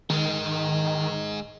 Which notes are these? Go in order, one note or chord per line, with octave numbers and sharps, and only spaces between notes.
G#2 D#3 G#3